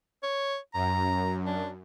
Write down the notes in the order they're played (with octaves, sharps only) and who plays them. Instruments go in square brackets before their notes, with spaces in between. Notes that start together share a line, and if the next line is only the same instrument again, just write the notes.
[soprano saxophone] C#5
[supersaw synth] F#2 [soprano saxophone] A#5
[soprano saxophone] D4